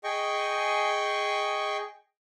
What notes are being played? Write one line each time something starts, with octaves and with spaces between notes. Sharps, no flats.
G#4 D#5 G5 C#6